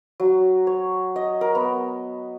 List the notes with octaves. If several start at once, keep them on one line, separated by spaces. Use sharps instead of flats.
F#3
C#5
D#5
A#4
B3